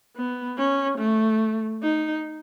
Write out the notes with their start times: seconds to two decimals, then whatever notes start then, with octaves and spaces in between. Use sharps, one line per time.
0.16 B3
0.58 C#4
0.99 A3
1.83 D#4